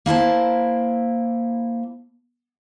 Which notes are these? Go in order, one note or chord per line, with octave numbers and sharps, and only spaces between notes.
A#3 E4 C5 A5